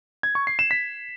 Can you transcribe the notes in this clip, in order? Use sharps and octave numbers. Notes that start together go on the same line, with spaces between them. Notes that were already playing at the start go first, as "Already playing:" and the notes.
G#6
C#6
C7
E7
B6